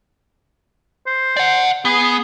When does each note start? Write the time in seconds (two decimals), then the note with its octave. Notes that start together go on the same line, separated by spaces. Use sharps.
1.07 C5
1.37 D5 F#5
1.85 B3 G#4